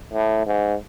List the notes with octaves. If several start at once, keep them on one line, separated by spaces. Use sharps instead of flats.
A2
G#2